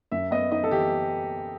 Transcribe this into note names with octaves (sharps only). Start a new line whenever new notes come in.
F#2 E5
B3 D#5
D#4 D#5
A4
E3 G4